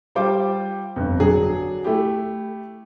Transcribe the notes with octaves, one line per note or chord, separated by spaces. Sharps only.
G3 F4 C5 G5 D6
G1 F2
D3 F#3 D4 G#4
A3 E4 G4